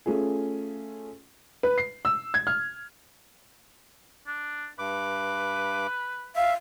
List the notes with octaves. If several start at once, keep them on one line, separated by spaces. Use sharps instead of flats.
A3 C#4 F4 G#4
B4
C7
E6
G#6
F6
D4
G2 B4 D6
E5 F5